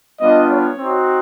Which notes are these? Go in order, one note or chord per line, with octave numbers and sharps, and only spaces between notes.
G3 B3 D4 F4 D#5
C#5
C4 D#4 F#4